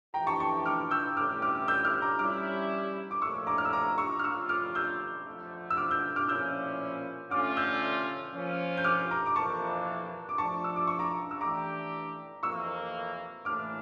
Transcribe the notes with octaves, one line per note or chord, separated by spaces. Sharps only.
F2 E3 A3 E4 G4 G5 A#5
A5 C#6
A5 C#6
D6 F6
E6 G6
A2 E3 G3 C#4 G4 D6 F6
D6 F6
E6 G6
D6 F6
A#5 D6
G3 C#4 E4 D6 F6
D6
A#2 F3 A3 C#4 C#6 E6
A#5 D6
F6
E6
A#5 D6
C#6 E6
F6
F2 D3 A3 C#4 F4 C#6 E6
D6 F6
E6 G6
F2 D3 F3 A3
E6
D6 F6
E6 G6
D6 F6
A#2 F3 C#4 E4 E6 G6
D3 A3 C#4 F4 D6 F6
E6 G6
F3 A#3 C#4 F4
G6
D6 F6
A#5 D6
D6
F2 E3 A#3 D4 A5 C#6
D6
F3 A3 D4 A4 A5 C#6
E6
D6
C#6
A#5 D6
E6
E3 A3 D4 G4 A#5 D6
F2 E3 A#3 C#6 E6
A2 E3 A#3 D4 D6 F6